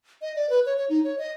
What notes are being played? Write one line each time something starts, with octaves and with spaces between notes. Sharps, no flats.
D#5
D5
B4
C#5
C#5
D#4
C#5
D#5